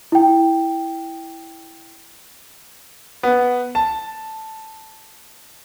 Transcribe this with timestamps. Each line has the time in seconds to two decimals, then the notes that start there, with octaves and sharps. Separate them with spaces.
0.12 E4 G5
3.23 B3
3.75 A5